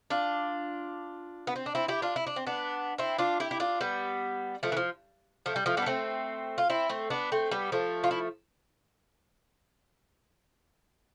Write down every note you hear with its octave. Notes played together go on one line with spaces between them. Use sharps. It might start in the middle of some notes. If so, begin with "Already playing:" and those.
D4 F4
B3
C4
D4
C4 E4
E4 G4
D4 F4
E4
D4
C4
B3 D4
C4 E4
D4 F4
E4 G4
E4
D4 F4
G3 B3
F3 A3
E3
F3
F3 A3
G3
F3 A3
G3 B3
D4
A3 C4
F4
C4 E4
A3 C4
B3 D4
A3 C4
G3 B3
F3 A3
F4
E4